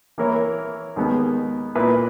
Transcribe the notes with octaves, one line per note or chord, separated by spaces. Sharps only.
E3 A#3 E4 A#4 C#5
D#2 D#3 G#3 B3
A#2 A#3 E4 B4